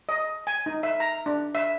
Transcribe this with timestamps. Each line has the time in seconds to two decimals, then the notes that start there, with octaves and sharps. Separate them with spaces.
0.09 D#5
0.47 G#5
0.66 D#4
0.83 E5
1.00 A#5
1.26 D4
1.55 E5